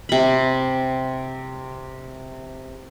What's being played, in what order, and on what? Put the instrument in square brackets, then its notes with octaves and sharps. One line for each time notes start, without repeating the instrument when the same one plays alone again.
[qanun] C3 B5